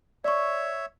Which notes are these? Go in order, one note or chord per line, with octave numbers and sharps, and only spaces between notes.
C#5 D5 E5 C#6